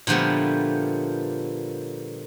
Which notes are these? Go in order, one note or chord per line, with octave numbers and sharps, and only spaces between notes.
A#2 D3 F3 G3 A3 B3